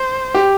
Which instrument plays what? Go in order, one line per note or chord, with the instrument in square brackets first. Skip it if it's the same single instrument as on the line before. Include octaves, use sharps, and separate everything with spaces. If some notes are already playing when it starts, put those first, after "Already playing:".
Already playing: [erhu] C5
[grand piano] G4